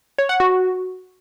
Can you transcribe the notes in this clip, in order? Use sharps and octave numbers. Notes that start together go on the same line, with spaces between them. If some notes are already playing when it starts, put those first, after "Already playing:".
C#5
F#5
F#4